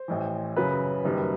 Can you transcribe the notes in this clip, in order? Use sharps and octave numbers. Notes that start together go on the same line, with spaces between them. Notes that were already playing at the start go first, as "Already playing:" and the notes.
Already playing: C5
A1 A2 E3
F#2 C#3 F#3 B4
F#1 F#2 D#3 G3